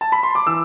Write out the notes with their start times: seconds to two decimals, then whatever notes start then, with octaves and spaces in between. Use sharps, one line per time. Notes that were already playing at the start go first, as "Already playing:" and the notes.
0.01 A5
0.12 B5
0.23 C6
0.35 D6
0.46 E3 E6